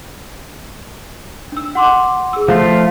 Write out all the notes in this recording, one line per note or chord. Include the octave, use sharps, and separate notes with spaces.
D4 E6
F#5 C6 D6
G#4 E6
F3 A3 F4 F5 C7